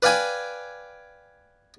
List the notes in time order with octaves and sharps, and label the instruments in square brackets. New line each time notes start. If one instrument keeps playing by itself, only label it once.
[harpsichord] B4 D5 F5 G5 G#5 D6